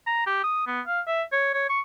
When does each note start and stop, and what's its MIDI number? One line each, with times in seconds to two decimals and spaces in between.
0.07 0.24 82
0.26 0.39 67
0.44 0.64 87
0.67 0.81 59
0.87 1.00 77
1.07 1.23 76
1.32 1.50 73
1.54 1.66 73
1.69 1.81 85